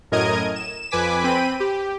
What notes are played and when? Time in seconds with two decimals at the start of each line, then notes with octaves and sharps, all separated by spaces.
0.12 F#2 A2 A#4 D#5 G#6 D#7
0.56 E7
0.91 F2 B4 G#5 D6 B6
1.24 C4 G5 B5 D#7
1.60 G4